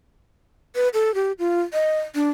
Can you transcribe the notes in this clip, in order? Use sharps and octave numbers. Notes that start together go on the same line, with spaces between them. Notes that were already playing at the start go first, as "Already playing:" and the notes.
B4
A4
G4
F4
D#5
D4